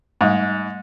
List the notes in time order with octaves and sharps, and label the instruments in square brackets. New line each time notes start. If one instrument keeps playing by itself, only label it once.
[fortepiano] G#2 [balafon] G3 A3